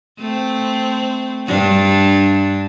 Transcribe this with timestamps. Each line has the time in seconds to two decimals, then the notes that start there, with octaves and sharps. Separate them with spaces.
0.19 A3 C4
1.48 G2 D4